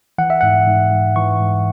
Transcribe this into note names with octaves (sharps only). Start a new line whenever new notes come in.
E3 F#5
E5
G#2 F#5
G#2
G#2
E3 C#6
G#2